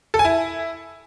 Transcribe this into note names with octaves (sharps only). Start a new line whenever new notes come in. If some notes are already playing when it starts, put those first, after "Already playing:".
A4
G#5
E4